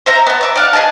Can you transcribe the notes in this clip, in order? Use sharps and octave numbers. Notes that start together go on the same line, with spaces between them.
C5 E5 A#5
B3 A5
C#5 E5 D6
D5 F5 F#5
G#4 A#4 D#5 A5